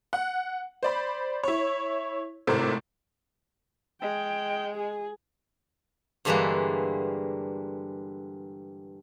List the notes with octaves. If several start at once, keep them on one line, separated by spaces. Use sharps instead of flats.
F#5
C5 D5 B5
E4 C#5
G#1 A2 C3 A3 A#4 C5
G#3 G5
G#4
G2 D3 E3 G3 G#3 A#3